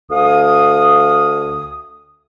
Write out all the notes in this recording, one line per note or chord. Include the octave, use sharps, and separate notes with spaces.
D2 F5 D#6